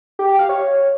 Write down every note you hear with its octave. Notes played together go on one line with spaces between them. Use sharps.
G4
G4
F5
C#5